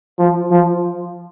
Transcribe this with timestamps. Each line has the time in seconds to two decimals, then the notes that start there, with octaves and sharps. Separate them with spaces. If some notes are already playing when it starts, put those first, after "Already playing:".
0.19 F3
0.51 F3